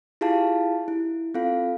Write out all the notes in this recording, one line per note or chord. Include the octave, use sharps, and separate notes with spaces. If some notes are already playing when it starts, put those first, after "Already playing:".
E4 F4 G4 G#4 F5 A5
E4
C4 F4 A4 F5